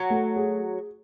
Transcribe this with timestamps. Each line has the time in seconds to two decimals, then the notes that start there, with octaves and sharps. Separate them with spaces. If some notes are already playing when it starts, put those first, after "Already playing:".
Already playing: F#3
0.10 A3
0.36 G#4